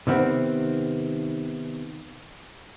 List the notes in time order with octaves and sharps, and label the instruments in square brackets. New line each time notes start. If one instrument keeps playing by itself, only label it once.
[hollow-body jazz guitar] C3 D#3 B3 C4